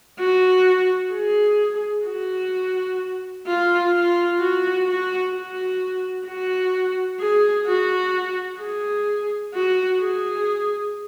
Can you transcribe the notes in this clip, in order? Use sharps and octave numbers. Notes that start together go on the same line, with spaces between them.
F#4
G#4
F#4
F4
F4
F#4
F#4
F#4
F#4
G#4
F#4
G#4
F#4
G#4